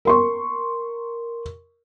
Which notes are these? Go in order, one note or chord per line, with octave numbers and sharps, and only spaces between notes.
A#4 C6 C#6